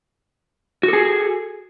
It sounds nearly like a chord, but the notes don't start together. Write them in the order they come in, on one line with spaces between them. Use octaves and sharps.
F#4 A4 G#4